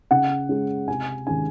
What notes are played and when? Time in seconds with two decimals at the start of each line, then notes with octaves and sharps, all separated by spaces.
0.11 C#3 F#5
0.49 G#3 C#4
0.88 C3 G#5
1.27 D#3 G#3 C#4 G#5